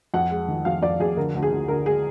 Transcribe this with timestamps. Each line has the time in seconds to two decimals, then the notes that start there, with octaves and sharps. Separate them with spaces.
0.14 F2 F#5
0.31 G#3
0.48 D#3
0.65 F2 F5
0.82 F2 D5
1.00 F2 G#4
1.17 D3 A#4
1.35 D2
1.42 G#4
1.51 D2
1.68 D3 A#4
1.86 G#3 G#4